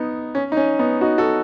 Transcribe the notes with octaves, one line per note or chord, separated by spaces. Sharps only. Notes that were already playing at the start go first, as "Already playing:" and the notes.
Already playing: B3 D#4
C#4
D#4
C#4
B3 D#4
D#4 F#4
F#4 A4